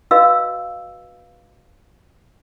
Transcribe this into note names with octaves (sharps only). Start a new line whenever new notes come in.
F#4 B4 D#5 F5 E6